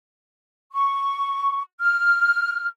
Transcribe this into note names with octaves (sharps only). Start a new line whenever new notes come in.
C#6
F6